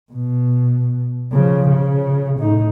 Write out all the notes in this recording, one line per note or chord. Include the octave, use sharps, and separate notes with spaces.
B2
C#3 F3
C#3
A2 D#4